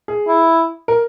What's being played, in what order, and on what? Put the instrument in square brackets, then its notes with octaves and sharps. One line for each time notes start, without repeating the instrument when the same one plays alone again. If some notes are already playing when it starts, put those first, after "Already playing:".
[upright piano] G#4
[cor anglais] E4
[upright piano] A#4